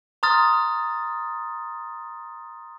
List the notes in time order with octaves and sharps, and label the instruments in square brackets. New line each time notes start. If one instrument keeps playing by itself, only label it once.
[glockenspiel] A#5 C6 D#6 F6 A6